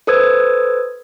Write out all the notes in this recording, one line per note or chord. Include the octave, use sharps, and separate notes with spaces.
A4 B4 C5 D#6 E6 G#6